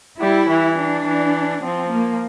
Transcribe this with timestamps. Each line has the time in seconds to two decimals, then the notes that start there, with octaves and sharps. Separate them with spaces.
0.20 G3 E4
0.49 E3
0.79 D4
1.07 E3
1.64 F3 C4
1.93 A#3